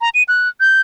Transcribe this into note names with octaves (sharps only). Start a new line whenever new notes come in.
A#5
D#7
F#6
G6